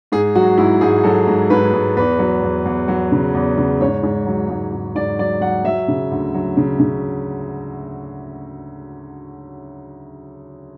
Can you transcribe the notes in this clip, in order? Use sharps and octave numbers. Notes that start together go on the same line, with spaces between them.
G#2 G#4
F#3 F#4
G#2 E4
G#2 G#4
F#3 A4
G#2
G#2 B4
G#2
E2 B4
F#3
E2
E2
F#3
C#3
E2
C#3
G#2 C#5
G#2
F#3
G#2
G#2
G#2 D5
F#3 D5
F#3 F#5
F#3 E5
C#3
D2
F#3
C#3
C#3